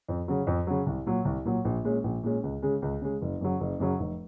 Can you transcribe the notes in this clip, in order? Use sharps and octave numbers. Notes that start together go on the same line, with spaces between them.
F2
C#3 F#3
F2
C#3 F#3
C2
A#2 F#3
C2
A#2 F#3
A#1
A#2 G#3 C#4
A#1
A#2 G#3 C#4
C#2
C#3 G#3
C#2
C#3 G#3
F#1
F#2 C#3 F#3
F#1
F#2 C#3 F#3
F1